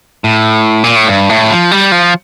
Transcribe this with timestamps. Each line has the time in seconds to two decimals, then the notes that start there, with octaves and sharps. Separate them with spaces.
0.24 A2
0.84 A#2
0.96 A2
1.08 G2
1.29 A2
1.50 F3
1.71 G3
1.92 F3